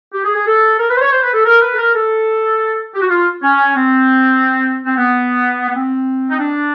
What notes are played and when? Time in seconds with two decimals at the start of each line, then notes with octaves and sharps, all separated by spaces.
0.14 G4
0.25 G#4
0.36 G#4
0.47 A4
0.80 A#4
0.90 B4
0.97 C5
1.01 C#5
1.13 C5
1.23 B4
1.34 A4
1.45 A#4
1.62 B4
1.73 A4
1.79 A#4
1.95 A4
2.94 G4
3.02 F#4
3.10 F4
3.43 C#4
3.77 C4
4.86 C4
4.97 B3
5.69 B3
5.74 C4
6.31 D#4
6.40 D4